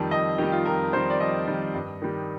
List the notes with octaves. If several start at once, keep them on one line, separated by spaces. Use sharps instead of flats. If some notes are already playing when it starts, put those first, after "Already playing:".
Already playing: F2 D#3 G3 A5
F2 D#5
D#3 G3 G4
F4
F2 A#4
D#3 G3 C5
D5
F2 D#5
D#3 G3
G2
D#3 G3